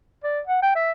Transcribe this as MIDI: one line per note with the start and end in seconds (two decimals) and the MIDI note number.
0.24 0.40 74
0.47 0.61 78
0.62 0.72 79
0.75 0.92 76